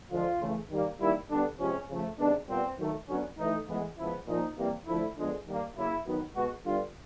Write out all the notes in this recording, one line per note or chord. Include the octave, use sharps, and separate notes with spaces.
D3 F3 G#3 F4
C#3 E3 A3
D#3 G3 A#3
D#3 G3 A#3 E4
D3 G3 B3 D4
C3 F3 G#3 C#4
C#3 F3 A3
C3 D#3 G#3 B3 D4
A#2 G3 B3 C4
D#3 F#3 A3
D3 F#3 B3 C#4
A2 E3 A3 D#4
A2 E3 G#3 B3
C#3 F3 G#3 B3 E4
A#2 F3 A#3 D#4
C3 E3 G3 A#3
D3 F3 A3 E4
D3 F3 G#3 B3
D#3 G3 A#3
C#3 F#3 A#3 E4
D#3 F#3 B3
B2 G#3 B3 F#4
D3 G3 B3 F4